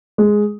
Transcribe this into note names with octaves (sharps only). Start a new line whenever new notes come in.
G#3